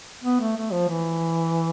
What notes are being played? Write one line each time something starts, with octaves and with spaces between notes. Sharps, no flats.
B3
A3
A3
F3
E3